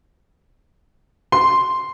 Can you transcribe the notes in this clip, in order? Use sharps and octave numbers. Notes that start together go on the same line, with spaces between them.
C6